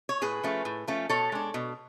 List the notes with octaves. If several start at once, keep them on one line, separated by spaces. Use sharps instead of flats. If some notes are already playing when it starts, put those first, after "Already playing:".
C#5
A2 G#4 B4
F3 A3 C#4
A2
F3 A3 C#4
B2 A4 C#5
G#3 D4
B2